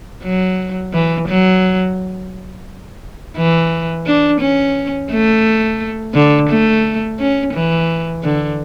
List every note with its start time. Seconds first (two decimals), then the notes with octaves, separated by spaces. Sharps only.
0.23 F#3
0.93 E3
1.28 F#3
3.37 E3
4.06 D4
4.40 C#4
5.11 A3
6.14 D3
6.49 A3
7.19 C#4
7.54 E3
8.24 D3